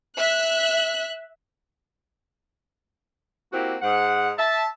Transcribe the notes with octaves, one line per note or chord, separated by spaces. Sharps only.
E5 F#6
A#3 C4 E4 F#4 G4
G#2 F#5
E5 A5